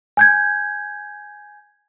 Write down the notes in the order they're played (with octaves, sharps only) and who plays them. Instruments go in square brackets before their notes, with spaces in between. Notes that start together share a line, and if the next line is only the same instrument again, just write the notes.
[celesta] G#5 G6 G#6